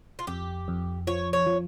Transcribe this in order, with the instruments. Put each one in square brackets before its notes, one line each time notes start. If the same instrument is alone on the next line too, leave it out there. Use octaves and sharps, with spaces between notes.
[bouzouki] F4
[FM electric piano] F2 [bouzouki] G4
[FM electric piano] F2
[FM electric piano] F3 [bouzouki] C#5
[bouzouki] C#5
[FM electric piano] F3